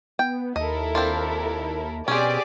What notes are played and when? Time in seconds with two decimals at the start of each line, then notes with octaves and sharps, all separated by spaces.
0.19 B3 G5
0.56 D#2 E4 A4 A#4 D#5
0.95 C4 D4 F4
2.08 B2 C4 C#4 G4 G#4 D5